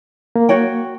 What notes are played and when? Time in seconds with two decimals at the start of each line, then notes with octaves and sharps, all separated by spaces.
0.36 A#3
0.49 F#4 C#5 G5